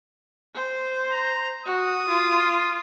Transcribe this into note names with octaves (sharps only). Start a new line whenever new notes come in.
C5
A#5
F#4 D#6
F4